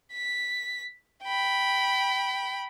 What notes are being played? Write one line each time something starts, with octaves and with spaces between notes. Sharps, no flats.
B6
G5 B5